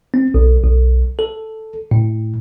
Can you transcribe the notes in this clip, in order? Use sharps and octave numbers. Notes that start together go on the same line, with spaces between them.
C4
B1
B1
A4
A2